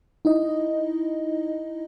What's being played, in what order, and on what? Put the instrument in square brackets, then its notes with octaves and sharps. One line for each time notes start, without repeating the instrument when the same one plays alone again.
[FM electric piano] D#4 E4 D#5